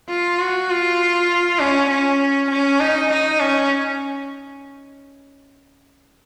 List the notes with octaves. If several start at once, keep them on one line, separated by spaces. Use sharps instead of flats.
F4
F#4
F4
C#4
C#4
C#4
D#4
D#4
C#4